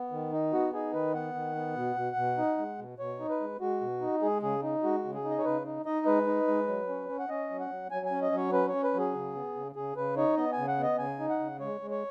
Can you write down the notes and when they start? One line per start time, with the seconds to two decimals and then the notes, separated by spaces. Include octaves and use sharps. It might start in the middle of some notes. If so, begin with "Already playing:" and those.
Already playing: B3
0.11 D#3
0.32 D#4
0.53 B3 F#4
0.73 D#4 G#4
0.93 D#3 B4
1.14 B3 F#5
1.34 D#3
1.56 B3
1.76 B2
1.96 B2
2.16 B2
2.38 D#4
2.58 G#3
2.78 B2
2.99 B2 C#5
3.20 D#4
3.29 B4
3.40 G#3
3.60 G#3 F#4
3.81 B2
4.01 D#4
4.22 G#3 G#4
4.42 C#3 G#4
4.63 D#4
4.83 G#3 F#4
5.04 C#3
5.14 G#4
5.24 D#4
5.31 D#5
5.38 C#5
5.45 C#3 B4
5.66 D#4
5.86 D#4 D#5
6.06 G#3 B4
6.27 D#4
6.48 G#3
6.68 F#3
6.89 C#4
7.09 C#4
7.19 F#5
7.29 C#4 D#5
7.50 F#3
7.60 F#5
7.70 F#3
7.91 F#3 G#5
8.06 G#5
8.11 C#4
8.22 D#5
8.32 F#3 C#5
8.53 C#4 B4
8.68 C#5
8.73 C#4
8.84 B4
8.94 F#3 G#4
9.14 C#3
9.35 B3
9.55 C#3
9.76 C#3 G#4
9.96 C#3 B4
10.17 D#4 C#5
10.37 B3 D#5
10.53 C#3 G#5
10.68 F#5
10.78 B3 D#5
10.98 C#3 G#5
11.19 D#4
11.29 F#5
11.40 C#3
11.60 G#3 C#5
11.81 G#3
11.91 C#5